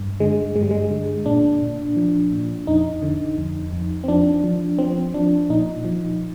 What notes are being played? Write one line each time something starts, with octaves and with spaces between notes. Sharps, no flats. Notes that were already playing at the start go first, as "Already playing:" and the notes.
Already playing: G2
D3 G#3
G2 G#3
G3
G#3
D3
A#2 D4
A#2
F3
A#2
F2 D#4
D3
F2
F2
C4
F3 D4
F3
F3 C4
F3 D4
A#2 D#4
F3